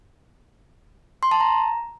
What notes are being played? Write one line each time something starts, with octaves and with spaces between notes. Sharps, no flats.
C6
A5
A#5